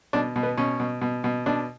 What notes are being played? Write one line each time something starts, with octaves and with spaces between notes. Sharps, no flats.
B2 D4
B2
B3
B2 C#4
B2
B2
B2
B2 D4